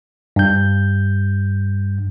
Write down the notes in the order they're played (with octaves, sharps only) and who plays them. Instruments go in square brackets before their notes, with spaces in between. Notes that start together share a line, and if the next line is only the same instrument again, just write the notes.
[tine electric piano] G2 G6